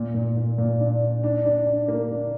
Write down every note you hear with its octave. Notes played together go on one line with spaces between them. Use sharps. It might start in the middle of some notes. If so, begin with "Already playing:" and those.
Already playing: A#2
A#2
A#2
A#2
D4
D4
D4
D4
D4
A#3
D4